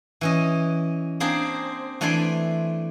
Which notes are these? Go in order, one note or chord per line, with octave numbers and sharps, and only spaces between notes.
E3 C#4 D#5
A#3 C4 D4 G#4 C5
E3 A3 D4 D5 G#5 C6